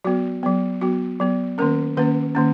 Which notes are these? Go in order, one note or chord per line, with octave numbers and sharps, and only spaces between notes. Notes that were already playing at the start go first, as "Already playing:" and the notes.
F#3 B3 F#4
F#3 B3
F#3 B3 F#4
F#3 B3
D#3 A#3 C#4 A#4
D#3 A#3 C#4 B4
D#3 A#3 C#4